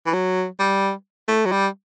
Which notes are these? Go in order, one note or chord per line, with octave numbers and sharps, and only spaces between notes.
E3
F#3
G3
A3
F#3
G3